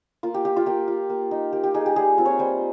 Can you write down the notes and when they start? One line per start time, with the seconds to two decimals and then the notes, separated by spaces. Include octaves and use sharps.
0.23 A#3 F4
0.34 G4
0.45 F4 G4
0.56 F4
0.66 A#3 G4
0.88 F4
1.09 A#3
1.31 D#4
1.53 A#3 G4
1.64 G4
1.74 D#4 G#4
1.86 G4
1.96 G3 G#4
2.18 C4 F4
2.25 C#5
2.39 G3 C5